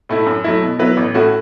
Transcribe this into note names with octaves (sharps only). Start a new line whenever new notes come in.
A2 A3 E4
F#2
F#3 A3 E4
B2
F#3 B3 E4 B4
A1
A2 A3 C#4 F#4